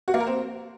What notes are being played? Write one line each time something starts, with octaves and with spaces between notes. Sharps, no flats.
F#4
A#3
A#4
C4